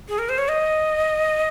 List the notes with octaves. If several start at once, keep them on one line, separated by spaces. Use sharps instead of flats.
G#4
A#4
C5
C#5
D#5